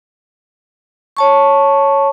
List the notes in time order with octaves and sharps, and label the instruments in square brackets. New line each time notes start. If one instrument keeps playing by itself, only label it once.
[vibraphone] C#5 A5 C#6